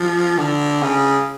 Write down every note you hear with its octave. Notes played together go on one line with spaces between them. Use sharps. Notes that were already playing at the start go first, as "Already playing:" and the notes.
Already playing: F3
D3
C#3